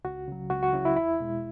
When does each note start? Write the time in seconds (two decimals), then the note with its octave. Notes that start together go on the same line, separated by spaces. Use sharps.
0.05 C#2 F#4
0.28 C#3 F#3
0.50 C#2 F#4
0.63 F#4
0.73 C#3 F#3 E4
0.85 E4
0.97 E2 E4
1.20 B2 G#3